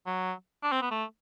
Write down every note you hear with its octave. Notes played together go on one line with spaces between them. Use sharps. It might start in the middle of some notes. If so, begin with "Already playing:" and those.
F#3
D4
C4
B3
A3